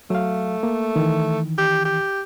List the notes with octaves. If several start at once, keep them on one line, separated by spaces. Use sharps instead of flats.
F#3 A3 F5
A#3
D#3 E3
G4
G4